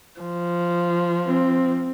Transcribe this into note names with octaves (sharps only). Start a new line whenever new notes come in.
F3
C4